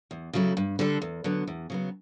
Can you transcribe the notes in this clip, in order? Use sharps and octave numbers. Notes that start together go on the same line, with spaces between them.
E2
C#3 F#3 A3 E4
G2
D3 G3 D4 A4
E2
D3 F#3 B3
E2
C#3 F#3 B3